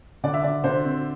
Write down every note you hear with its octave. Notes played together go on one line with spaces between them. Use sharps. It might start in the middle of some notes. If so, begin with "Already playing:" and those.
D3 D5
E5
D3 D5
D3 C5
C4